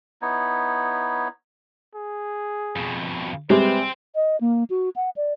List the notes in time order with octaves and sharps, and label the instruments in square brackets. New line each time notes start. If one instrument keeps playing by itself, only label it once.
[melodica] B3 D#4 E4 C#5
[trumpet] G#4
[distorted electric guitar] F2 B2
[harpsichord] C3 [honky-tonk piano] G3 G#3 [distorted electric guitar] C4 [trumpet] B4
[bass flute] D#5
A#3
F#4
F#5
D5